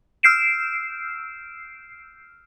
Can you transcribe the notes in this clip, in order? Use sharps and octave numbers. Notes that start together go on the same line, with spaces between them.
E6 F6 G6 C7 D7 E7